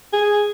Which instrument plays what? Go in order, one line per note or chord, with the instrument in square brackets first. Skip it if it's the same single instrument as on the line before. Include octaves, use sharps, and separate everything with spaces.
[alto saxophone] G#4